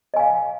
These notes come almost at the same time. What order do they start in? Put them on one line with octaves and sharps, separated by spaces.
D#5 G#5 F5